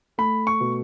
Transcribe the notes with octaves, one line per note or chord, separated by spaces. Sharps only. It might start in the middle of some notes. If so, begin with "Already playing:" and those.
A3 B5
C#6
B2